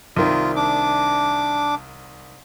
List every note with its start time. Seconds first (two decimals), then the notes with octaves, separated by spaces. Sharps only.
0.17 C2 D#3 F4
0.56 D4 D6